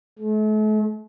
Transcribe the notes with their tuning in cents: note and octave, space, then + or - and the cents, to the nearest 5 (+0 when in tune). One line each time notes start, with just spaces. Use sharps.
A3 -40